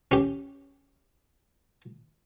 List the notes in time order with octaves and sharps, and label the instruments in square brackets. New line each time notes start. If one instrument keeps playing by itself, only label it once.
[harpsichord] C#4 G4